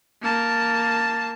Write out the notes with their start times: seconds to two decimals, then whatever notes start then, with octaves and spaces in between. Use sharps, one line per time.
0.22 A#3 A5